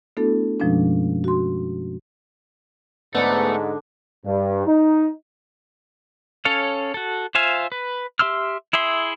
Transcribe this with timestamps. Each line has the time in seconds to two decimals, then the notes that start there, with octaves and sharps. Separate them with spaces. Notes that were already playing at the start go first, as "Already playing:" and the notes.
0.17 A3 B3 D4 E4 F#4 A4
0.60 F#2 B2 F3 G#3 C#4 D4
1.24 F#4 C6
3.15 G#2 D3 A3 B3 D4 D#4
4.26 G2
4.67 D#4
6.45 C#4 A4 C#5 F5
6.94 F#4 A4
7.35 F4 C5 E5 F5 G#5
7.72 B4
8.19 G4 E5 C6 E6 F6
8.73 E4 G#4 E5 C6